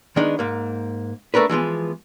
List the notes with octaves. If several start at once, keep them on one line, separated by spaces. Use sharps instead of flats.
D#3 G#3 B3 D4 D#4
G#2 A#3
A3 D4 A#4 B4
E3 F3 G#3 B3